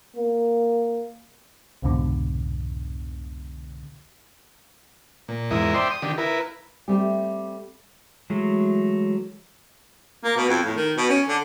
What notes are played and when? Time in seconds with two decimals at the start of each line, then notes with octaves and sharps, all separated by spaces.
0.16 A#3
1.82 C2 F2 G#2 B2 D3
5.28 A#2
5.51 E2 G#2 E4 A#4 D#5
5.74 C5 D5 E5 G5 C6
5.91 D#6
6.02 D3 D#3 G4
6.18 E4 A#4 B4
6.88 G3 A3 C4 G4
8.30 E3 F#3 G#3 A3
10.24 A#3
10.37 B2
10.49 F2
10.64 A2
10.76 D#3
10.97 B2
11.09 C#4
11.28 D3